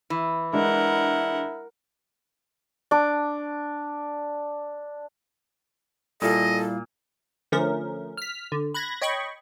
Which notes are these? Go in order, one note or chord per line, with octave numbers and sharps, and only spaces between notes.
E3
G#3 D4 E4 A#4 F#5
D4 D6
A#2 G3 E4 A4 D#5 F5
D3 F3 A3 C#4 A#4
F6 B6
D3
B5 F#6 G#6 A#6
C#5 D#5 G5 B5 C#6